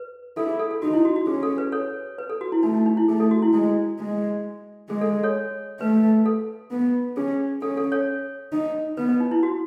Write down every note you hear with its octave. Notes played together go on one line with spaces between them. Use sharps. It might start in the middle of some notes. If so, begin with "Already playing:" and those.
Already playing: B4
E4 A4
G#4
A4
A4
D#4 F#4
E4
F#4
F#4
C#4 G#4
A4
B4
A4 C#5
B4
A4
F#4
E4
A3 D#4
D#4
D#4
E4
A3 G#4
A4
F#4
E4
G#3 E4
G#3
G#3 G#4
A4
A4 C#5
A3 B4
A4
B3
C#4 G#4
C#4 A4
A4
A4 C#5
D#4
B3 B4
B4
D#4
E4
F#4